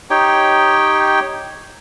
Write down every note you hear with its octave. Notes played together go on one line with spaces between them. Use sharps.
D#4 G4 C#5 G5